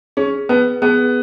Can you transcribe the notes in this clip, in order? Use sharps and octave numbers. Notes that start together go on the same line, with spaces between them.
C#4 G#4
B3 B4
B3 G#4